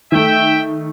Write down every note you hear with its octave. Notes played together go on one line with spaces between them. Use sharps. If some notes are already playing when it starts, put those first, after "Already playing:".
D#3 A3 E5 G5